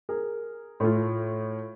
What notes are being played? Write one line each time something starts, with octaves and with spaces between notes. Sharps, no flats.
G#4 A#4
A2 A3 F4